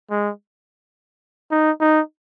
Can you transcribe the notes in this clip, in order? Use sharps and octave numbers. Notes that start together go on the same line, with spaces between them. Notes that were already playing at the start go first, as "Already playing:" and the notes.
G#3
D#4
D#4